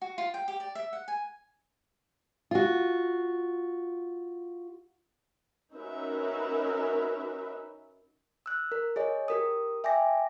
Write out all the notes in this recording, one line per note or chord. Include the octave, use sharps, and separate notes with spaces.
F#4
F4
G5
G4
D5
E5
F#5
G#5
F4 F#4
C#4 D#4 F#4 A#4 B4 E5
E6 F#6
A#4
G#4 C#5 D#5
G4 A#4 D#6
E5 G5 G#5 D6 A#6